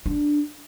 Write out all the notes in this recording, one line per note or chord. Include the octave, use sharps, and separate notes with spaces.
D4